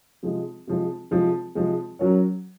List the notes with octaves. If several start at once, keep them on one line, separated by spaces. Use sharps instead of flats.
C3 F3 G#3
C3 F3 G#3
C3 F3 G#3
C3 F3 G#3
F#3 C#4 F#4 A#4 C#5